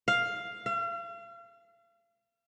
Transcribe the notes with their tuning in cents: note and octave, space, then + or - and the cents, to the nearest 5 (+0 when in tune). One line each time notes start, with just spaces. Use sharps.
F5 +5
F5 -40